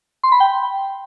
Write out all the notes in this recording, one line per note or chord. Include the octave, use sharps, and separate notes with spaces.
C6
B5
G5